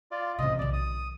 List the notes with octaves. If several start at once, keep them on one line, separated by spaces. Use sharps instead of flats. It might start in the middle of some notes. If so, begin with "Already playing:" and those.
F4 D5
A1 C3 D#5
B1 D#3 D5
D#6